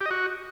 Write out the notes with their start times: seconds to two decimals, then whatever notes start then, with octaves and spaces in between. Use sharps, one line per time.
0.01 G4
0.06 D#5
0.11 F#4